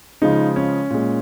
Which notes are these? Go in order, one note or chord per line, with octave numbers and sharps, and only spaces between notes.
C#3 F3 G#3 D#4
C#4
A#2 G#3